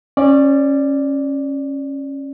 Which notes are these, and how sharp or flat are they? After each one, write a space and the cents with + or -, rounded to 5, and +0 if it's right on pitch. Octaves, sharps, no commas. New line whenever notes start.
C#4 -15 D5 +5